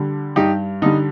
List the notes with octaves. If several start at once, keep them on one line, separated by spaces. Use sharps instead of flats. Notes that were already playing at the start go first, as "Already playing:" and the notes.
Already playing: D3 G3
G2 D#4 G4
D3 G3 D#4